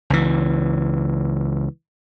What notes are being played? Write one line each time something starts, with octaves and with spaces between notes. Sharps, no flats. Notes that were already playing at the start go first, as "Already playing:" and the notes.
C#2 E3